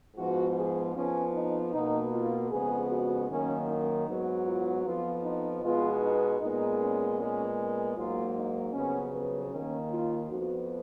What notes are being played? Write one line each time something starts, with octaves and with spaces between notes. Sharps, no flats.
G#2 F3 B3 F#4
G#4
F2 F3 B3 C#4
D#4
B2 A#3 D#4
F4
F2 C#3 G#3 B3 G#4
F#4
F#2 D#3 A#3 C#4
D#4
G#2 F#3 B3
F4
F2 F3 B3 F4
D#4
B2 G#3 B3 F4
D#4
A#2 G#3 B3 D#4
C#4
A#2 G#3 B3 C#4
G#2 F#3 A#3 F4
D#4
F2 C#3 F#3 B3 C#4
B3
D#2 D#3 A#3 C#4
F4
F2 F3 B3 F#4